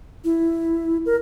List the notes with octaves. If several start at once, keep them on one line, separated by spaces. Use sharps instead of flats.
E4
A#4